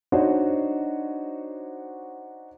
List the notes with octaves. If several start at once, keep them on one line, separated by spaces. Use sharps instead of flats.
D4 D#4 F#4 C5 C#5 D#5